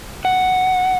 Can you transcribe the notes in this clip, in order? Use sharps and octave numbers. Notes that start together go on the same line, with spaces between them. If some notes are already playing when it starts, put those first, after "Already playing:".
F#5